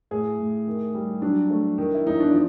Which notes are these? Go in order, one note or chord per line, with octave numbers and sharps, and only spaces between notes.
A2 G#4
A2
D#3
G3
F#3 D4
A3
D#3
E4
E2 D#4
D4
F3